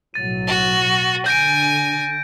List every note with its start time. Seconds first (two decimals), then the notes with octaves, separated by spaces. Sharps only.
0.14 B1 A2 F#3 A6 D#7
0.48 F#4
1.26 D3 G#5 G6 A#6 D7